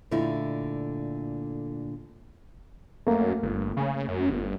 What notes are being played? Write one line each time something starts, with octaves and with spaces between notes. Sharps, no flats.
A#2 D3 A3 D#4 E4
F#2 A3 A#3
G1
C#3
F#2
G1